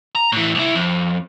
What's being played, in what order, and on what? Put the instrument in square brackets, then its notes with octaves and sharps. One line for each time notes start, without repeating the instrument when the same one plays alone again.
[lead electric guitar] A#5
A2 E3
C2 E4
F2